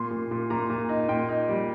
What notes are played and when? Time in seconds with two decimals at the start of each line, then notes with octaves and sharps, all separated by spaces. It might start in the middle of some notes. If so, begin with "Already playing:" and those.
Already playing: A#2 C6
0.11 A#2
0.31 A#2
0.50 A#2 A#5
0.70 A#2
0.89 D#4
1.09 A#2 G5
1.29 D#4
1.48 G3